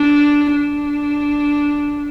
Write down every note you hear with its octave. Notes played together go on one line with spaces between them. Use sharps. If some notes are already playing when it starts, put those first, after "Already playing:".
Already playing: D4
D4